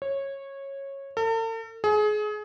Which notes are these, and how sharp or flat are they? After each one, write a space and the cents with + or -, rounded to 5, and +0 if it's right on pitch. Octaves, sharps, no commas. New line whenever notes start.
C#5 -15
A4 +45
G#4 +30